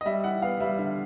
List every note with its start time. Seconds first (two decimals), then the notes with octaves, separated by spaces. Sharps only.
0.01 D#5
0.06 G3 E5
0.24 E4 F#5
0.42 B3 F5
0.60 G3 E5
0.79 D3 E5